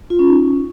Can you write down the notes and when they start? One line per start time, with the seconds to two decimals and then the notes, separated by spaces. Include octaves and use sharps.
0.10 F4
0.19 C#4
0.28 D#4